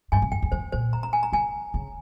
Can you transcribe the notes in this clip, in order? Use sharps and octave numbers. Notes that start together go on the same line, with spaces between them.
G2 G#5
C3
F2 G5
E2
F2 C5
A#2 C5
A#5
A#5
G#5
A#5
C#3 G#5
C#3